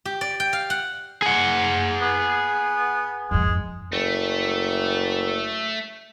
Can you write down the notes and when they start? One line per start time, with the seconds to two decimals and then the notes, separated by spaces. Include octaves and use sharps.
0.05 G4
0.21 D5
0.40 G5
0.53 F5
0.70 F#5
1.22 G#4 F#5
2.01 B3
3.31 F2 G#2 G#3
3.92 F#1 A3